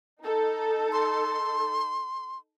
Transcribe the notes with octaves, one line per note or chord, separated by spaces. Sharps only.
D#4 A4
C6